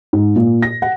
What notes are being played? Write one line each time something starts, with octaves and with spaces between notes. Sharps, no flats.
G#2
A#2
A#6
F#5